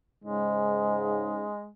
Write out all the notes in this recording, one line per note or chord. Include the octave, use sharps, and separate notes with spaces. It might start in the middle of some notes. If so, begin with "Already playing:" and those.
G#2 C#3 G#3